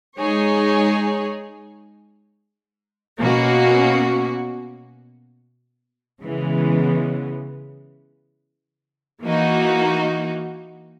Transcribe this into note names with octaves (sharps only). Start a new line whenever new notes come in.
G#3 D#4 G#4 C#5
B2 A#3 C#4 F#4
C#3 E3 G#3 B3
E3 A#3 D#4 F#4